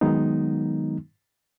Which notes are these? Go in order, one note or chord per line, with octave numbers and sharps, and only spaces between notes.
D#3 F#3 G#3 B3 D#4